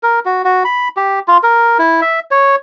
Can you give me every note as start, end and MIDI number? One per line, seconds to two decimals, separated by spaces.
0.03 0.20 70
0.25 0.42 66
0.45 0.63 66
0.65 0.88 83
0.97 1.19 67
1.28 1.38 65
1.43 1.78 70
1.79 2.01 64
2.02 2.20 76
2.31 2.56 73